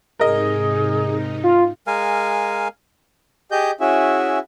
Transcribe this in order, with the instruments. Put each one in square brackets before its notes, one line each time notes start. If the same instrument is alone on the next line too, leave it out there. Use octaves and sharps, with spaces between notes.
[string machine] G#2 C3 D#4 [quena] G#4 [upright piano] A#4 D#5
[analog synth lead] F4
[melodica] G#3 A#4 F5 G#5
[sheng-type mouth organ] G4 G#4 D#5 G6
C#4 E4 F#4 G#4 E5